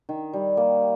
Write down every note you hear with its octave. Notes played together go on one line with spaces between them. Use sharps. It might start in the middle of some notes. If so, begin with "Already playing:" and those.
D#3
G3
A#3